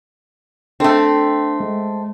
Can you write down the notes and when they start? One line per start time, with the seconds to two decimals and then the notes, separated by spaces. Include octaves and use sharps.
0.80 A3 C4 D4 A4
1.60 G#3